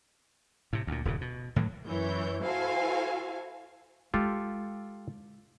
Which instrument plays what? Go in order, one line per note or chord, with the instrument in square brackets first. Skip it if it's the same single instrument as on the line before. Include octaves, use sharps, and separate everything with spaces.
[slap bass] A2 C3
D2 A#2
D#1 G2 C#3
B2
A2 D#3 E3 F#3
[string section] F#2 E3 C#5 G6
E4 F#4 A4 C5 F5 G#5
[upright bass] G#3 [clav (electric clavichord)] F4 G4 A4